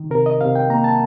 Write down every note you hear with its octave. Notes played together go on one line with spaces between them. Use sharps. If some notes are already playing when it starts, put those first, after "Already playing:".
Already playing: D#3
C3 A#4
D#5
C3 F5
G5
A#3 A#5
A5